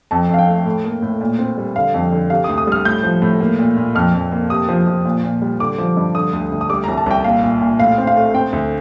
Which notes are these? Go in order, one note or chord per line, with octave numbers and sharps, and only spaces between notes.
F2 A5
F2 F5
G5
A3
A2
A#3
A2
A#2
C4
G3
D3 F5
F2
D3
C3 F5
D#6
D2
D#6
G3 F6
A2 G6
F3
A2
A#3
A#2
A#2
F2 F6
F2
A#3
C3 D#6
F3
F3
A#2
A#2
G3
D3 D6
F3
G2
D3 D#6
D2
D2
D#6
G3 D6
A#5
C2
A5
C2 G5
A#2 F5
A#2
A#2
A2 F5
C4
F5
A3
C4 G5
D2